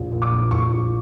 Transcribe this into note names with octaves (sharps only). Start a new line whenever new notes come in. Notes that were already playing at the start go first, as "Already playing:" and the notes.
Already playing: A#1
A#2
D6
A#1
A#1 C#6
A#1